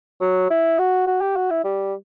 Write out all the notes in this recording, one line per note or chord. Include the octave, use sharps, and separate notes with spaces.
F#3
E4
F#4
F#4
G4
F#4
E4
G3